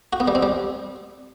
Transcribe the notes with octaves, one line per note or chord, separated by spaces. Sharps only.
F#4
B3
G3
C4
G3